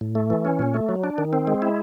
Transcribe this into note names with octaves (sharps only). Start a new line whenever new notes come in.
A2
A3
E3
C#4
A#2
A3
F#3
D4
D#3
C4
G#3
E4